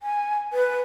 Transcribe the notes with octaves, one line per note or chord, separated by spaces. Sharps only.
G#5
B4